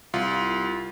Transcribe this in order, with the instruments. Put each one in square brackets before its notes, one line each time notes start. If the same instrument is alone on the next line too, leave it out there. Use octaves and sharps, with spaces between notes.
[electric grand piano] C2 F4